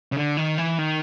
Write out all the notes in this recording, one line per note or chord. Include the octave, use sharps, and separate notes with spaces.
C#3
D3
D#3
E3
D#3